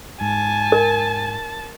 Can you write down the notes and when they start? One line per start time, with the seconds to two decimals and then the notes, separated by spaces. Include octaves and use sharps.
0.21 G#2 G#5 A5
0.72 A#4